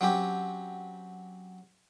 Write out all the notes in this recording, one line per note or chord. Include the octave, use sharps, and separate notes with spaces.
F#3 C4 C#4 G4